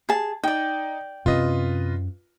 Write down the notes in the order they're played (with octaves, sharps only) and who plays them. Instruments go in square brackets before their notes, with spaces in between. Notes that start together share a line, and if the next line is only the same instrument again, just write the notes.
[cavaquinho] G#4 A5
[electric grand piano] D#4 [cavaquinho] D5 G5
[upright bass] F#2 C#4 [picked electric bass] C3 [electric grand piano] F4 B4 D#5